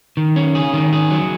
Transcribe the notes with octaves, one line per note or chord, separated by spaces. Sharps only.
D#3
C#4
G#4
D#3
G#4
F#3